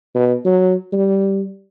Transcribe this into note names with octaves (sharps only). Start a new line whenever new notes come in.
B2
F#3
G3